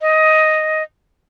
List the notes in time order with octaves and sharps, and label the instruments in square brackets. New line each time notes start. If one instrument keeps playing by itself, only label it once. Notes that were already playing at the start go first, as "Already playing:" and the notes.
[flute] D#5